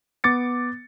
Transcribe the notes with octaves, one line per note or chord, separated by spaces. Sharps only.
B3 D6 A6 C#7